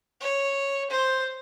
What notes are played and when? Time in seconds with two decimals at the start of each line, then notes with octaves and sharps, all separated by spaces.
0.21 C#5
0.90 C5